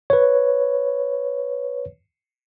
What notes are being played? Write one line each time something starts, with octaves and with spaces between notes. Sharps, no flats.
B4 C#5